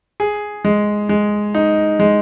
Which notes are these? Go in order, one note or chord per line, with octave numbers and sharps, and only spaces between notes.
G#4
G#3
G#3
D#4
G#3